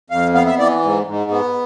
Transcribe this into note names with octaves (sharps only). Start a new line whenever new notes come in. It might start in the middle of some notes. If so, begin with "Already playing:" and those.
F2 F5
B3 F5
E5
E3 D5
G#2
G#2
B3